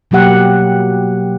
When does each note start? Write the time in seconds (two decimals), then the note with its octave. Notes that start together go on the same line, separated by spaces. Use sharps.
0.11 B2 F#3 A#3 G4 F#5